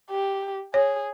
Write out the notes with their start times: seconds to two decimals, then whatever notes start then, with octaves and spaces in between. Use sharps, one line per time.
0.10 G4
0.74 G#4 C#5